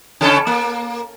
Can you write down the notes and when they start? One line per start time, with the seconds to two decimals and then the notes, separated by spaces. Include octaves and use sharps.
0.21 C#3 C#4 A4
0.47 A#3